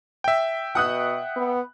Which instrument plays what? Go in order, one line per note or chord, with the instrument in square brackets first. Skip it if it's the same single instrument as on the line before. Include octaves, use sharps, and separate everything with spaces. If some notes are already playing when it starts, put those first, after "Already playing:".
[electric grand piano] E5 G5
[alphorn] B2 [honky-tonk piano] F#5 D#6 F#6
[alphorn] B3